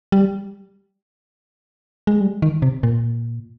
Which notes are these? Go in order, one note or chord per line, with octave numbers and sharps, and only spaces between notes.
G3
G#3
G3
D#3
C3
A#2